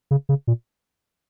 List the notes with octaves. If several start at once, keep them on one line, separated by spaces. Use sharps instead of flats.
C#3
C#3
A#2